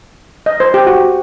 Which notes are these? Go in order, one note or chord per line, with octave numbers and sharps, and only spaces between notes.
D#5
C5
G4
F#4